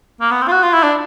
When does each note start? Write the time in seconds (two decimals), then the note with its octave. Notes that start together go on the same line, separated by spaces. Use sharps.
0.21 A#3
0.31 B3
0.42 C4
0.48 F4
0.52 F#4
0.63 F4
0.73 E4
0.83 D4